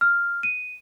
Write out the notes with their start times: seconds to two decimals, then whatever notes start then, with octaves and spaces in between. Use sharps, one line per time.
0.01 F6
0.43 D#7